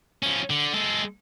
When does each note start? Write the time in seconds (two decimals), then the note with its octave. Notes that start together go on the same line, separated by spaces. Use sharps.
0.23 F3 C#4
0.50 D3
0.73 G#3 A4